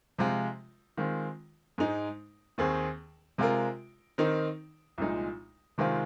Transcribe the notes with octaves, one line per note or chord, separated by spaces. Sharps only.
C3 F3 G#3 F4
D#3 G#3 C4 F4
G#2 G#3 D#4
D#2 D#3 C4 G#4
C3 G#3 F4 A#4
D#3 C4 D#4 A#4
C2 A#2 F3 G#3 D#4
C3 D#3 G#3 C4 F4